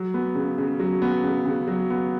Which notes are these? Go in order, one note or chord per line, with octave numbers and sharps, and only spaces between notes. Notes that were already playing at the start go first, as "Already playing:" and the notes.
Already playing: F#3
B3
C#3
C#3
F#3
B3
C#3
C#3
F#3
B3